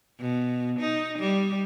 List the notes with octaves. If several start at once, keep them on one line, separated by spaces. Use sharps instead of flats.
B2
D#4
G3